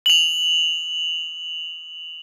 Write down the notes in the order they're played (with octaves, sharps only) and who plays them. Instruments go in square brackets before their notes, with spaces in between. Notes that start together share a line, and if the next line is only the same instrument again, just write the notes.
[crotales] F7 F#7